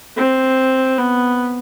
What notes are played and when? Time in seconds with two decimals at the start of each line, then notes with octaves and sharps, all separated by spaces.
0.17 C4
0.98 B3